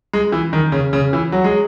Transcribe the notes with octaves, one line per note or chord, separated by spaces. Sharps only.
G#3
E3
D#3
C#3
C#3
E3
F#3
G#3